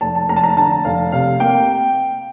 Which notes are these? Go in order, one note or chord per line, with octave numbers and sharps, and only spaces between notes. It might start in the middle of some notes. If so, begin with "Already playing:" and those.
F1 A5
A5
F1 A#5
A5
A#5
D3 A5
F1 F5
C3 F5
A#3 G5